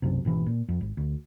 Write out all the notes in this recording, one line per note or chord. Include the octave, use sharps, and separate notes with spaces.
B1 F#2 C3
G#1 B2 E3
A#2
F2
G#1
D2